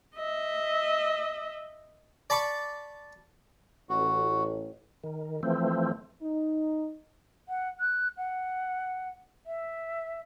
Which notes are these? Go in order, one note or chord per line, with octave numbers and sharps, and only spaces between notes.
D#5 E5
D5 A5 B5 C#6 D6
A1 F#4
D#3
E3 F3 A3 C4
D#4
F#5
F#6
F#5
E5